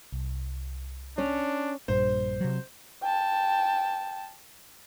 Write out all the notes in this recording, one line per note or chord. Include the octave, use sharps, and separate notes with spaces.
C2
C#4 D4 C#5
A#1 G2 C5
C3 F#3
G5 A5